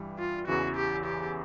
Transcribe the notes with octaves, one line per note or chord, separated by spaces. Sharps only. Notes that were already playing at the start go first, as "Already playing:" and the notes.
Already playing: G2 E3 G3
F4
E2 C#3 E3 F#4
G4
G4